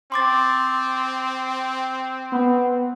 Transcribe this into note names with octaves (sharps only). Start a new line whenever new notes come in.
C4 C6 D6 A6
B3